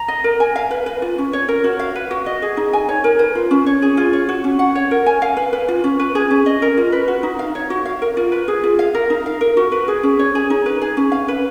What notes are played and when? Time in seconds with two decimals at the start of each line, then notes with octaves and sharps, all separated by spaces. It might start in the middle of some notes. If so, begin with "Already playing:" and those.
Already playing: A#5
0.08 D#5
0.24 A#4
0.40 G#5
0.56 F5
0.71 B4
0.86 B4
1.02 F4
1.18 C#4
1.33 C#5
1.48 A#4
1.64 F#4
1.79 F5
1.96 B4
2.11 F#4
2.26 D#5
2.42 G#4
2.57 D#4
2.73 G#5
2.89 C#5
3.04 A#4
3.19 B4
3.35 F4
3.51 C#4
3.66 C#5
3.82 G#4
3.97 F4
4.13 C#5
4.29 F#4
4.44 C#4
4.59 F#5
4.75 C#5
4.91 A#4
5.06 G#5
5.22 F5
5.37 B4
5.53 B4
5.68 F4
5.84 C#4
6.00 B4
6.15 G#4
6.31 C#4
6.46 D#5
6.62 A#4
6.77 F4
6.92 B4
7.08 F#4
7.23 D#4
7.39 F5
7.55 C#5
7.70 F#4
7.86 F5
8.02 A#4
8.17 F4
8.32 B4
8.48 G#4
8.63 F4
8.79 F5
8.95 A#4
9.10 D#4
9.26 F5
9.41 A#4
9.57 F#4
9.72 B4
9.88 G#4
10.03 C#4
10.19 C#5
10.35 G#4
10.50 D#4
10.66 B4
10.81 G#4
10.97 C#4
11.12 F5
11.28 B4